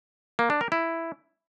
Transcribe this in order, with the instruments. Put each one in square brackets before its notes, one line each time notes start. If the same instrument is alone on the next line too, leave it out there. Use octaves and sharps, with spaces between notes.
[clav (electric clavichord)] A#3
D4
A#4
E4